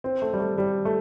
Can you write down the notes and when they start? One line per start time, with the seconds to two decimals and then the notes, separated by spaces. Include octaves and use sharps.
0.04 C4
0.22 A3
0.33 G3
0.39 A3
0.58 G3
0.85 A3